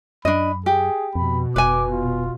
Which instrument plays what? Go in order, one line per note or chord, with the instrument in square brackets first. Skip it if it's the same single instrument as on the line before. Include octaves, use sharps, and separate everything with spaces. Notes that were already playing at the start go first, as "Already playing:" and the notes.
[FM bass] F#2 [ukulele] D4 D#5 [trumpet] B5
[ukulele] G4 [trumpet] G#4
[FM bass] F2 [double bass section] B2 [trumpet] B5
[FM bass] F1 [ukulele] B4 G#5 [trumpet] D6
[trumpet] F4